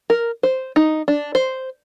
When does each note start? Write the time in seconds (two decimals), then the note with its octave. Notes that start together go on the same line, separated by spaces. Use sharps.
0.10 A#4
0.43 C5
0.76 D#4
1.08 D4
1.35 C5